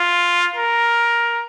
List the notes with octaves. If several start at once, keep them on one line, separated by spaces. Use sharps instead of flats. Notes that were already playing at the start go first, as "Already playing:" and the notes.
Already playing: F4
A#4